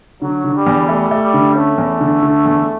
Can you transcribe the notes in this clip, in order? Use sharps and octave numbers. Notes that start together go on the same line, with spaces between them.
D3 F#3
D3
G3
E2
G3 A3
A3
G3
D3
A3 C#4
E2
D3
D3
E2